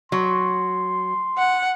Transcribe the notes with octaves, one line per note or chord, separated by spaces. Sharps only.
F#3 C6
F#5